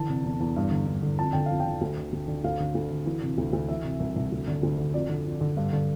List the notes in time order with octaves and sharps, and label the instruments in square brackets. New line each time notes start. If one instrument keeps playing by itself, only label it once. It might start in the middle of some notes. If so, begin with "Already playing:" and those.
Already playing: [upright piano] D3 E3 A5
C3
E2
E2
G2
D3
G2
D3
F2 A5
D3 G5
F2 F5
G5
D3
D2
D3
D2
D3
D2 F5
D3
D2
D3
E3
C3
D2
D2
E3 E5
C3
C2
C2
D2
D3
D2
D3
F2 D5
D3
F2
D3
G2
D3